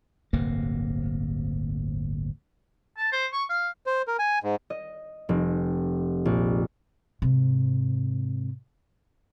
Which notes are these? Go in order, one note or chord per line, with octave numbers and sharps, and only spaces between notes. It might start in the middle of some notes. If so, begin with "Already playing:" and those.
D1 G1 C3 A#3
A5
C5
C#6
F5
C5
A#4
G#5
G#2
D#5
F1
A#1
G#2 C3